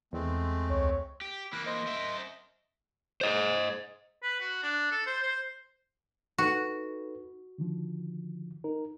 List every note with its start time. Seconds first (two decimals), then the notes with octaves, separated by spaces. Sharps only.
0.13 E2 G#3 A3 C4
0.70 C#2 C#5
1.21 G4
1.53 E3 A#3 B5 F#6
1.66 C5 D#5
1.87 A#4 E5
3.21 C5 D#5
4.23 B4
4.41 F#4
4.63 D4
4.91 A4
5.06 C5
5.23 C5
6.38 D#4 F#4 A4 B4
7.58 D3 D#3 F3
8.64 D#4 A#4